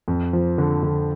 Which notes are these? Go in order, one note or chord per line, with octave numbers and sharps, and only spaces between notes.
F2
F3
D3
D3